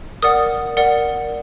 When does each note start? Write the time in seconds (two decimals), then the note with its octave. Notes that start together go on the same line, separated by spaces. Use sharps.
0.23 A#4 D5 F#5 D#6
0.77 A#4 D5 F#5